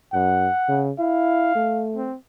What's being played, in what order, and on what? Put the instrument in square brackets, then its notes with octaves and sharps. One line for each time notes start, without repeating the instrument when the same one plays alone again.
[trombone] F#2 [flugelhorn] F#5
[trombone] C#3
[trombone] E4 [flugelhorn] F5
[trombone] A3
[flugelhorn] C4